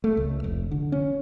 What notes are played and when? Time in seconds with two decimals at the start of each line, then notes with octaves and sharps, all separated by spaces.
0.04 A3
0.17 C#2
0.44 F1
0.71 D3
0.92 C#4